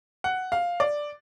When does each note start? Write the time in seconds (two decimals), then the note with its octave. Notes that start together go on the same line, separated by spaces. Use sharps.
0.24 F#5
0.52 F5
0.80 D5